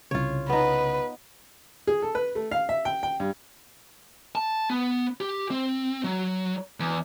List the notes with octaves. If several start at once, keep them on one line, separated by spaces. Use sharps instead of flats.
C2 C#3 F4 C#5
B3 D#4 B4
G#4
A4
B4
A3
F5
E5
G5
G5
G2
A5
B3
G4
C4
F#3
E2